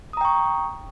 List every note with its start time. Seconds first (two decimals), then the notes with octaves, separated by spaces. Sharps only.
0.13 D#6
0.17 A#5
0.21 G5
0.25 C#6